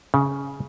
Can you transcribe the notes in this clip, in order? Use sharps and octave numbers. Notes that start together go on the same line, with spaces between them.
C#3